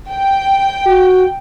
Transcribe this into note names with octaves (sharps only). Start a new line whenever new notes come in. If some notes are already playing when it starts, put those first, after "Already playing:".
G5
F#4